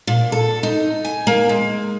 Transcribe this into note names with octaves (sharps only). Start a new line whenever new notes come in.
A#2
A4
D#4
G#5
A#3
G#3